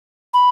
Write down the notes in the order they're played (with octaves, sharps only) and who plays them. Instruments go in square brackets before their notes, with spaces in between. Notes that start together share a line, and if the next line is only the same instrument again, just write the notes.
[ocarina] B5